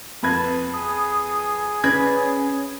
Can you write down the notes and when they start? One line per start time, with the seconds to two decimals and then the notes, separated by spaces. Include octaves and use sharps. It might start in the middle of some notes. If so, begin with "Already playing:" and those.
0.23 F2 B4 A5 G#6
0.73 G#4 D#6
1.84 C#4 B4 D5 B5 G#6